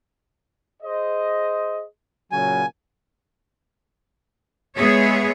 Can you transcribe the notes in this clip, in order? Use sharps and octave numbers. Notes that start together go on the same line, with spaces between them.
G#4 C5 D#5
A#2 C#3 F#3 G#5
G#3 B3 G#4 C#5 E5